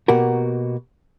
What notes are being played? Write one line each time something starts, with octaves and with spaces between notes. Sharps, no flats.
B2 A#3 F#4 G4 A#4